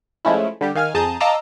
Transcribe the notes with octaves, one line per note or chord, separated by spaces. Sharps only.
F3 G#3 A3 C#4 E4
D3 G3 G4
D#3 F5 G#5 F6
F2 G#4 A5 A#5 D#6 G6
D#5 F5 A5 A#5 D6 E6